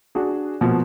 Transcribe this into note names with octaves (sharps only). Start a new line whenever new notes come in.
D4 F#4 G#4
B2 F3 A#3